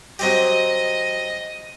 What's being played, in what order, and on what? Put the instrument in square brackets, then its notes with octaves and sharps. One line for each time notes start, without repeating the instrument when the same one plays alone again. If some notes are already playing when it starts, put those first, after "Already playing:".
[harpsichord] F#3 C4 G4 [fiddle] D#5